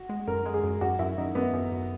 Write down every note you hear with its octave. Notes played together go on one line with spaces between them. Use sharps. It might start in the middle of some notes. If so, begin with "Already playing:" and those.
Already playing: F#4
G#3
F#2 A#4
G#3
G#4
F#2
F#2 F#4
F#2 E4
F#2 D#4
F#2 B3
F#2
F#2